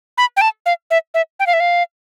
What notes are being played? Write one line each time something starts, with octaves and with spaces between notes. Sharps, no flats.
B5
G5
A5
F5
E5
E5
G5
F5
E5
F5